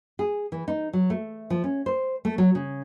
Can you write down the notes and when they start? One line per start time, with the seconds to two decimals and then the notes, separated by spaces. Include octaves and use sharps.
0.19 G#4
0.52 E3
0.68 D#4
0.93 F#3
1.10 A3
1.50 F3
1.64 C#4
1.86 C5
2.25 A3
2.38 F#3
2.55 C#3